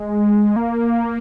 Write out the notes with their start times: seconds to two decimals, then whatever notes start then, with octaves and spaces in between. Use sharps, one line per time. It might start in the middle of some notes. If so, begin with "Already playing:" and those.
Already playing: G#3
0.56 A#3